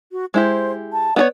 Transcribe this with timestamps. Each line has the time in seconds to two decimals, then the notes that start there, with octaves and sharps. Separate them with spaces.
0.12 F#4
0.34 G#3 E4 G4 C5
0.93 A5
1.16 B3 F#4 C#5 D5